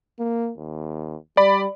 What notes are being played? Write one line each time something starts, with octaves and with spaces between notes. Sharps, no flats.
A#3
D#2
G3 D5 B5